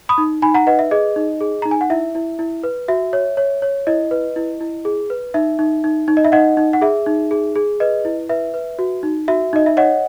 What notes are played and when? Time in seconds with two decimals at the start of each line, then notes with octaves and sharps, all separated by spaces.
0.09 B5 D#6
0.18 D#4
0.42 D#4 G#5 B5
0.54 F#5 A#5
0.67 B4 D#5 F#5
0.79 E5
0.91 G#4 D#5
1.16 D#4
1.41 G#4
1.62 D#4 A#5
1.71 G#5
1.81 F#5
1.90 E4 E5
2.15 E4
2.39 E4
2.63 B4
2.88 F#4 E5
3.13 C#5
3.37 C#5
3.62 C#5
3.87 E4 D#5
4.11 B4
4.36 E4
4.61 E4
4.85 G#4
5.10 B4
5.34 D#4 E5
5.59 D#4
5.84 D#4
6.08 D#4
6.17 D#5
6.24 E5
6.32 D#4 D#5 F#5
6.57 D#4
6.73 F#5
6.81 G#4 E5
7.06 D#4
7.31 G#4
7.56 G#4
7.80 B4 D#5
8.05 E4
8.29 B4 E5
8.54 B4
8.79 F#4
9.03 D#4
9.28 F#4 E5
9.53 D#4 D#5
9.66 E5
9.77 C#5 D#5 F#5